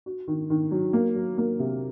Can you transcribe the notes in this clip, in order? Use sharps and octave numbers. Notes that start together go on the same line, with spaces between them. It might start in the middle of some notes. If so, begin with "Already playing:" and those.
F#4
D#3
D#3
F#3
A#3
F#3
A#3
C3